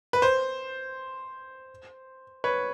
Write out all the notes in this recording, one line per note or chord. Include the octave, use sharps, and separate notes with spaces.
B4
C5
B4 C#5